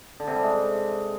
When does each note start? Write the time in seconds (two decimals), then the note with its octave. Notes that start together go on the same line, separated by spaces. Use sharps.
0.20 D3
0.28 C3
0.35 G3
0.43 G#3